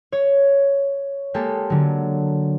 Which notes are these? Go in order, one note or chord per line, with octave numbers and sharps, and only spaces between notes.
C#5
G#3 A#3 G4 A4
D3 F#3